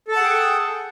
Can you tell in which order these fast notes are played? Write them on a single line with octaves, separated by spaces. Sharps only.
A4 A5 F#5 G#4 G5